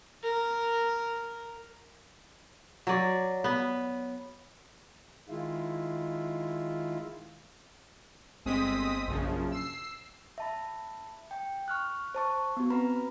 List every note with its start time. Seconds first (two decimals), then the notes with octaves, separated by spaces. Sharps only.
0.23 A#4
2.87 F#3 D5
3.44 B3
5.29 D#3 G#3 E4 F4
8.45 G1 G#3 C4 D#6 B6
9.07 A#1 F#2 C#3 F3
9.51 E6 C7
10.38 E5 A5 B5
11.31 G5
11.68 C#6 F6 F#6
12.15 C5 A5 C#6
12.57 B3 F#4
12.70 C4 B4 A#5 B5